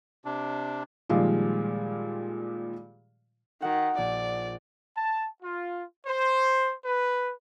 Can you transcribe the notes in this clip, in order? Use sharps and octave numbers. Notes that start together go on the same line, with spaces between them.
C3 D4
A#2 D#3 F3 G3 G#3 F4
D#3 F#4 F#5
A#1 D5
A5
F4
C5
B4